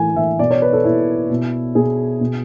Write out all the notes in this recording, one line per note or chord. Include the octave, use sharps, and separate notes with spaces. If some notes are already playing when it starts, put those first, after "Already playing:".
Already playing: A2 E3 G#5
E3 E5
B2 D5
C#5
B4
A4
B2 E4
B2
B2 G#4
B2